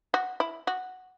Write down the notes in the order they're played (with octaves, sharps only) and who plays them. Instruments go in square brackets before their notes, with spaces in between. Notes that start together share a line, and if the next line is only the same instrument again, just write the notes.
[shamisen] F#4
E4
F#4